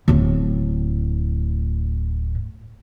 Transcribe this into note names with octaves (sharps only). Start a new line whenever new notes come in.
D1 A2